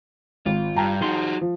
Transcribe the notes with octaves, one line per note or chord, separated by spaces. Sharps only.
G#1 F4
G2 G5 A5 A#5
F3 D#4 F#4 G#4 C6
F3